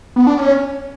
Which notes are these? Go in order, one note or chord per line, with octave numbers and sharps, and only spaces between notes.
B3
D4
C#4